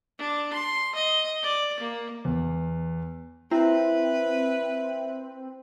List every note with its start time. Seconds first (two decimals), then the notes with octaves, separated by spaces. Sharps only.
0.19 D4
0.53 C6
0.95 D#5
1.42 D5
1.80 A#3
2.25 E2
3.51 C4 E4 B4 E5